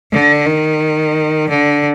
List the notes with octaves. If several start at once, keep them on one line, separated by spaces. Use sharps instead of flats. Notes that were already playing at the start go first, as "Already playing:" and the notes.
D3
D#3
D3